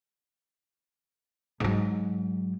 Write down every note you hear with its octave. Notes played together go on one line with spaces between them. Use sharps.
G#2 F#3